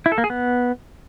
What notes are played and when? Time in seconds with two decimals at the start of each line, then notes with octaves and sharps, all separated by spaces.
0.06 E4
0.12 A4
0.18 A#3
0.24 G#4
0.30 B3